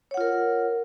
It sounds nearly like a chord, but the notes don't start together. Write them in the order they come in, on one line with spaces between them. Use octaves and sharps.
C#5 F#5 F4 A#4